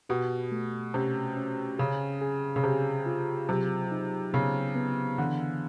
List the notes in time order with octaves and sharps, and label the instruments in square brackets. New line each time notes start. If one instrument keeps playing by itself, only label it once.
[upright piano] B2 [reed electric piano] G4
[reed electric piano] A3
[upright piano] C3 [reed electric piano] C#4
[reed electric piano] C#4
[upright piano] C#3 [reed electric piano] G#4
[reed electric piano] G#4
[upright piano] C#3
[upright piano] C3 [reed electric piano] G#4
[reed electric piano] F4
[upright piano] C3 [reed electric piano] F#3
[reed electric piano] D#4
[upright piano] C#3 [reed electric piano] B3
[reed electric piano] B3
[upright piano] D3 [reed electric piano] E3